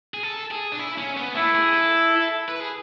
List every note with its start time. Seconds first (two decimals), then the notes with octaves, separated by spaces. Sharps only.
0.14 G#4
0.23 A4
0.51 G#4
0.72 D4
0.79 E4
0.98 C#4
1.17 B3
1.35 A3 E4
1.55 G#4
1.73 A4
2.49 B4
2.60 G#4